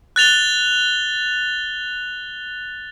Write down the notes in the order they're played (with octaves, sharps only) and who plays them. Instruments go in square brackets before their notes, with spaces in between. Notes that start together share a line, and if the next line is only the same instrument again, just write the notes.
[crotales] F#6 A6 F7 G7